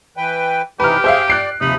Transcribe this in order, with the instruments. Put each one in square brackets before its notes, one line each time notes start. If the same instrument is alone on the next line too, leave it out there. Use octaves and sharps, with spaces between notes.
[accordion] E3 B4 G5
[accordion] C3 E3 D#4 [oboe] G4 [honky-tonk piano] B4 F6
[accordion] G#4 [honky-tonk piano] C5 E5 F5
[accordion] D5 [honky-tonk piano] F#6 C7 D7
[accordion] D#2 F3 B5 [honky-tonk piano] C3 [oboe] D#4